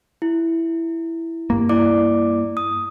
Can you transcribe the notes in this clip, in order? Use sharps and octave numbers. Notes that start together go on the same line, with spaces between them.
E4
G2 A#3
E4 D5 D6
D#6